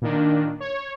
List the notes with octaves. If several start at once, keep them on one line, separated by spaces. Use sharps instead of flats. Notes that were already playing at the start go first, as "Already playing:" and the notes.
A#2 D#3 D4
C#5